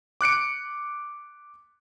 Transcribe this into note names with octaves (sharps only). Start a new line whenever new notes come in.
D6 F#6 C#7 D7